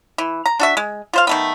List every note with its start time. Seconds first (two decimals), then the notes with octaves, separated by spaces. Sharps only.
0.18 E3
0.46 A#5
0.60 D4 F#4 E5
0.77 G#3
1.13 F4 C5 F5
1.27 D#3 A3 B3